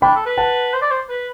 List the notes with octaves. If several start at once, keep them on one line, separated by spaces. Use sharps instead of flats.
D4 G5 B5
A4
B4
F#5 A5
C5
D5
C5
B4